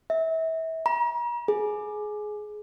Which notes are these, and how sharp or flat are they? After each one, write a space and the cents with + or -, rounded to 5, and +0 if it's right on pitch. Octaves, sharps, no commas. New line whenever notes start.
E5 -30
A#5 +40
G#4 +20